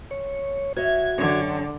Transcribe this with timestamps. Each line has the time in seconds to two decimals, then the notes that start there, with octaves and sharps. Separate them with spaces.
0.11 C#5
0.77 F#4 C#5 D#5 E5 G#6
1.18 F#2 D3 G4 C#5